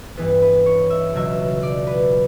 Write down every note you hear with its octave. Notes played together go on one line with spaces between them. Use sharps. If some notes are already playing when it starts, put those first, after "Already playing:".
G2 E3 B3 B4
B4
C#5
E5
C#2 B2 F#3 C#4 E5
D5
B4